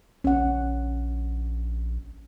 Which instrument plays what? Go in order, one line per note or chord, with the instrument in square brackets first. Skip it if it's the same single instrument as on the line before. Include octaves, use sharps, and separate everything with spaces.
[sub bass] A#1 [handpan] C#4 F#5